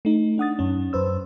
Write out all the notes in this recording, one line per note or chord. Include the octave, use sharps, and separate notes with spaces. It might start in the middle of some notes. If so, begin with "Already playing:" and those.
A3 D#4
D4 F#5 D#6 A6
F#2 C#4
F#2 B4 C5 E6